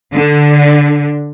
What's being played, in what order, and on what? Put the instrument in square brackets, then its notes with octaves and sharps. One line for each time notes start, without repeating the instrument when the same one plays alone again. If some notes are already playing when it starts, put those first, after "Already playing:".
[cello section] D3